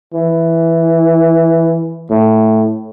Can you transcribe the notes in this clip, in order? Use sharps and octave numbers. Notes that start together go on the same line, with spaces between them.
E3
A2